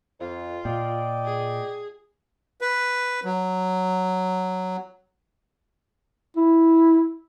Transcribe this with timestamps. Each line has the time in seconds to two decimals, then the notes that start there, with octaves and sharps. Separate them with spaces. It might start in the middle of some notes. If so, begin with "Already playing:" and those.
0.20 F2 F4
0.65 A#2 D5 D#5 G5
1.25 G#4
2.61 B4
3.24 F#3
6.37 E4